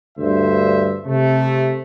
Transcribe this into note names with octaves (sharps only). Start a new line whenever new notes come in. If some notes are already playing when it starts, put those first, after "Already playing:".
D2 G2 C5 E5
C3 A3